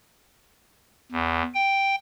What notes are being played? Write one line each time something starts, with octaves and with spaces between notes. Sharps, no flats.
E2
G5